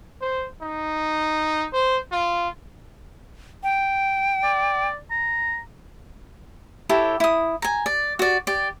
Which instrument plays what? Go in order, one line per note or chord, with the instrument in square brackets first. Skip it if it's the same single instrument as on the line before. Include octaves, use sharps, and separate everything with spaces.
[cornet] C5
D#4
C5
F4
[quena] G5
[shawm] D5
A#5
[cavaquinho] E4 G4 A4 C#5
E4 D#6
G#5 A#5
D5
F#4 D5
G4 D5